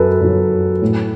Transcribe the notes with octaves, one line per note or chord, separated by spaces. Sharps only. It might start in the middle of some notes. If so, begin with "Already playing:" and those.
Already playing: F#2 F#3 A4 B4
F#2 F#3
A2 F#3